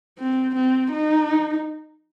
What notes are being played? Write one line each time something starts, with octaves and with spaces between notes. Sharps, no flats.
C4
C4
D#4